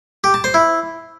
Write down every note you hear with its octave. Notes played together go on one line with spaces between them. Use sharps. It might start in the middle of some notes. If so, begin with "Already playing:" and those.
G4
A5
C5
E4